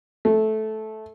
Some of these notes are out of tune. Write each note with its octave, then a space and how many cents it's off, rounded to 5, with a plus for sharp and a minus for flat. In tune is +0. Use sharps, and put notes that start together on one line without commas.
A3 -15